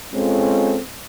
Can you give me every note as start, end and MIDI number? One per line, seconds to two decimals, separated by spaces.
0.15 0.78 56
0.15 0.78 60
0.15 0.78 61
0.15 0.78 65
0.15 0.78 69